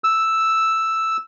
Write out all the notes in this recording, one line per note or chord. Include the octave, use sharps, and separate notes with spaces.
E6